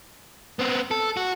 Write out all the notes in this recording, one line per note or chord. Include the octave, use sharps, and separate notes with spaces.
B3 C4
A4
F#4